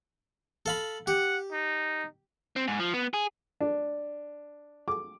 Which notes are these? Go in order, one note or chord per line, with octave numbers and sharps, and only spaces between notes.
A4 F5 B5
G4 F#5
D#4
C4
G#2
F3
B3
G#4
D4
D6